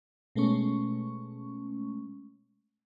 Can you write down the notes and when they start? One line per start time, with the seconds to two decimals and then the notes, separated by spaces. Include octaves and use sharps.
0.36 B2 G#3 A3 C#4 C#6